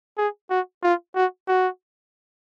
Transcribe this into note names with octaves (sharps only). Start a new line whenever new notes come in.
G#4
F#4
F4
F#4
F#4